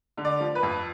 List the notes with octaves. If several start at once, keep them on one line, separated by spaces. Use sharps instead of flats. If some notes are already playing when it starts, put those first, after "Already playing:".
D3
D5
F3
B4
F2